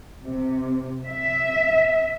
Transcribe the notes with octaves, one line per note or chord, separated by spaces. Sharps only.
C3
E5